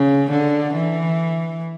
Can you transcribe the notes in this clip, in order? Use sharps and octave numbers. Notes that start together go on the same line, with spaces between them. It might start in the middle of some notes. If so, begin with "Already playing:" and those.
Already playing: C#3
D3
E3